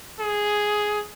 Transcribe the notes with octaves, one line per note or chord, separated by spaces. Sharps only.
G#4